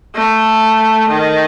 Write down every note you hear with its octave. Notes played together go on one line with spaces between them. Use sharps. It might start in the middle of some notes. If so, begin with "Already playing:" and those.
A3
D#3